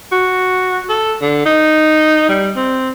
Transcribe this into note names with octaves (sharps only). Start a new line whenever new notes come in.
F#4
A4
D3
D#4
G3
C4